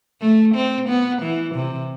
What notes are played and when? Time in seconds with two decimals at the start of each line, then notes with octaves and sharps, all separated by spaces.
0.22 A3
0.55 C4
0.89 B3
1.22 E3
1.55 C3